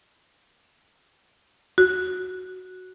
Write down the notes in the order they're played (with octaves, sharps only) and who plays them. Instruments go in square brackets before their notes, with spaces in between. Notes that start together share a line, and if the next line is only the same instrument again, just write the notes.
[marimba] F#4